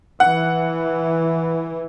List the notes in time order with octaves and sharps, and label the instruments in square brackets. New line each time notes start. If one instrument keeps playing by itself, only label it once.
[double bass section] E3 [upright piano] F#5